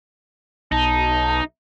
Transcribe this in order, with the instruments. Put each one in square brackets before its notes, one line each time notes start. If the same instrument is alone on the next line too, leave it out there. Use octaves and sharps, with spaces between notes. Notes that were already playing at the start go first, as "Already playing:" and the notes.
[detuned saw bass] B1 [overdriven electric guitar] D#4 [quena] A5